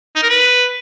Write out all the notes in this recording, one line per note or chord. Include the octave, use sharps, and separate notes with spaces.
D#4
A#4
B4